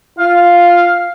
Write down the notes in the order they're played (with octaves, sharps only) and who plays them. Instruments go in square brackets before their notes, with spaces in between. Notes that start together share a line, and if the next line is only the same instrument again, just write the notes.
[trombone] F4 [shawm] F5